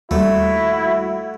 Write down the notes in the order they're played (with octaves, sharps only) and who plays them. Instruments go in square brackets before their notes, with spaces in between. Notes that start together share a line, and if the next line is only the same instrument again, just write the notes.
[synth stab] D#2 G3 [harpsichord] A3 [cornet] E4 [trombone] F#4